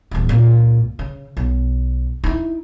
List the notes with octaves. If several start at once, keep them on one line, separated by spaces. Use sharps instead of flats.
D#1 E2
C#2 A#2
C#3
B1
D#4 E4